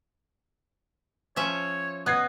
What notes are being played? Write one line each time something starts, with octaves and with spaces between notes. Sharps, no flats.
F3 C#4 C#5 E5
B3 D#5 F#6 G#6 C7